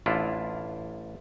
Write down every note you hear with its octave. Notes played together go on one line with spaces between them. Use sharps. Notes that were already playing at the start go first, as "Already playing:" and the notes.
A1 D4 E4 F4